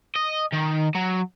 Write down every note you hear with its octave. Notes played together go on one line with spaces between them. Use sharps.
D#5
D#3
F#3